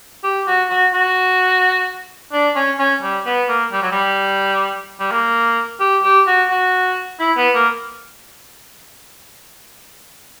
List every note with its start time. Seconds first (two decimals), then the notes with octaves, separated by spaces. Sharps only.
0.23 G4
0.47 F#4
0.70 F#4
0.94 F#4
2.33 D4
2.56 C#4
2.79 C#4
3.02 G3
3.26 B3
3.49 A#3
3.72 G3
3.82 F#3
3.91 G3
4.99 G3
5.11 A#3
5.80 G4
6.04 G4
6.27 F#4
6.50 F#4
7.20 E4
7.37 B3
7.54 A#3